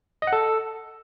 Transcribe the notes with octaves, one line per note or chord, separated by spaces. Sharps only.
D#5
F#5
A4